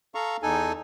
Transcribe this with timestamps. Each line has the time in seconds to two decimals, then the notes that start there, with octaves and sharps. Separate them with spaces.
0.15 A4 F5 A#5 C#6
0.43 E2 D#4 A4 G#5